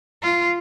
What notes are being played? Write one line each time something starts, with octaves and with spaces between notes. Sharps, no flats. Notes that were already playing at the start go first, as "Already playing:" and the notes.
F4